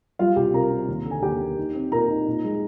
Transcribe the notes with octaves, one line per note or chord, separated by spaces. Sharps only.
G3 F4 F5
C2 G4 G5
C3 A#4 A#5
C3
D#2
D3
G#5
D#2 G4 G5
A#3
D#4
C4
A#2 A#4 A#5
D#4
A#2
G#3